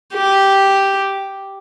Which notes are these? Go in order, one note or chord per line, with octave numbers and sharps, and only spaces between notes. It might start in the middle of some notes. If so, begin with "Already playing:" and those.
G4